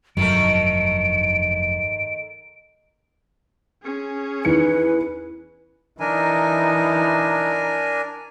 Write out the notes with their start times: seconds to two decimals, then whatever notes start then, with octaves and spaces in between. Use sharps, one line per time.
0.17 F1 G2 D#3 F#3 A3 A#4 D7
3.83 C#4 G#4
4.45 E2 D#3 B4 C#7
6.00 E3 D4 D#4 A#4 G#5